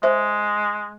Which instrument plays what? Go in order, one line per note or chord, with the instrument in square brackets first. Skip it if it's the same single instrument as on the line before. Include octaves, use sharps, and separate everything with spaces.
[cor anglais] G#3 [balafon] C5 E5